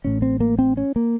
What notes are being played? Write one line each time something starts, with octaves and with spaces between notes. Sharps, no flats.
A1 A2 C#4
C4
A#3
C4
C#4
A#3